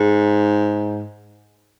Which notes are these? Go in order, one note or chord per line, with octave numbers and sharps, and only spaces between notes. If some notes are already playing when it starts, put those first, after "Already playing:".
Already playing: G#2